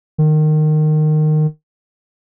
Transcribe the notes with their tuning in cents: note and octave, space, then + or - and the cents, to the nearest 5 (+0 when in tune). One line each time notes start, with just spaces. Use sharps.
D#3 -20